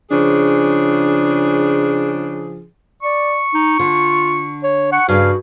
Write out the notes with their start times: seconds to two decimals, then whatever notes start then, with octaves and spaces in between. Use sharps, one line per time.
0.11 C#3 F3 D4 G#4
3.03 D5 C#6
3.54 D#4
3.79 D3 F4
4.64 C#5
4.92 F#5 C#6
5.09 G2 C#3 F#4 F5